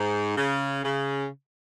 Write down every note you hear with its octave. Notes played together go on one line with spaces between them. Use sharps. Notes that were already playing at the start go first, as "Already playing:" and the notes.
Already playing: G#2
C#3
C#3